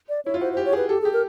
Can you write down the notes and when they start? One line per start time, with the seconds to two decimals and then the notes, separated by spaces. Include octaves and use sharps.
0.09 D5
0.25 E4 C#5
0.34 F4
0.41 F#4 C5
0.53 C5
0.57 G4
0.65 C#5
0.73 G#4 B4
0.89 G4 A4
1.01 G#4
1.05 G4
1.13 A#4